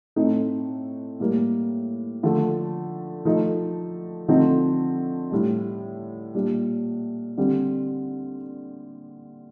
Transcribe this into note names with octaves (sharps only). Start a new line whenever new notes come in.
A2 A3 C4 D#4
A2 G3 A#3
D3 F3 A3
F3 A3 D#4
D3 F3 A3 C4 D#4
A2 G3 D4
A#2 G3 D4
D3 G3 C4